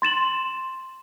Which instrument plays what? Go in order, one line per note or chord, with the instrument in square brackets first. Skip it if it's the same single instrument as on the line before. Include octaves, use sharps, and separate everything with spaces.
[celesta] C6 A6 E7 F#7